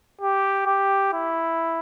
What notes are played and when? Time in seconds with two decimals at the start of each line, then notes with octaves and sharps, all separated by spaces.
0.21 G4
0.66 G4
1.13 E4